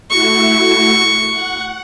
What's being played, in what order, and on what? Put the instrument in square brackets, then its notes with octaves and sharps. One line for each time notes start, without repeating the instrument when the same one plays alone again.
[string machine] A3 E4 F#4 [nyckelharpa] C#6
[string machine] F#5